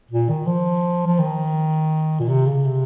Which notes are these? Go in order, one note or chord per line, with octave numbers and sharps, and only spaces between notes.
A#2
D#3
F3
F3
D#3
A#2
C3
C#3
C3